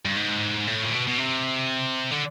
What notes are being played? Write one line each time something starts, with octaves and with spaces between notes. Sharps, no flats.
G2
G#2
A2
A#2
B2
B2
C3
D3